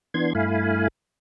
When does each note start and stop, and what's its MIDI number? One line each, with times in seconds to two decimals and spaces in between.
0.14 0.33 52
0.14 0.33 59
0.14 0.33 62
0.14 0.33 84
0.14 0.33 92
0.35 0.88 43
0.35 0.88 57
0.35 0.88 64
0.35 0.88 77
0.35 0.88 80
0.35 0.88 83